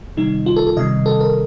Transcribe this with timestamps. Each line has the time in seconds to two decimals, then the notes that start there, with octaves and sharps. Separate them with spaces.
0.17 C3 D#3 G3 D#4
0.46 F4
0.56 A4
0.67 A4
0.77 C3 D#3 G3 D#5
1.06 A4
1.21 A#4